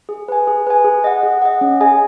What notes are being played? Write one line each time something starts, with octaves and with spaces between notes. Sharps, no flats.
G#4
B4 G#5
G#4
B4 G#5
G#4
D#5 F#5
G#4
D#5 F#5
C#4
G#4 D#5 G#5